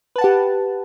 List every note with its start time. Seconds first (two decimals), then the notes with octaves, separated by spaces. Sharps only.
0.16 B4
0.18 A5
0.21 F#5
0.24 G4